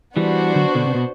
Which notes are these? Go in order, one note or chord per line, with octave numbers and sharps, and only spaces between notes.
E3 G3 B3 D4 F#4 C5
D3 F#3
B2 D3
C3
B2